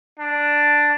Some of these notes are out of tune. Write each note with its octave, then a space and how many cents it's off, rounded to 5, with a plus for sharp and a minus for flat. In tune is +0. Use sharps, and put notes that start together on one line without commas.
D4 +0